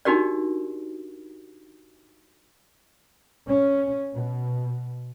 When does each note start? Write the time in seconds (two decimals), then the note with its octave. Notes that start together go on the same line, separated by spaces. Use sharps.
0.05 D4 D#4 F#4 G4 A#4 D5
3.47 C#4
4.14 B2